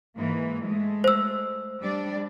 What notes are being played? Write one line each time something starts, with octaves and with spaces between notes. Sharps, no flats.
G#2 E3 A#3
G#3 A3
C5 E6
G3 D4 D5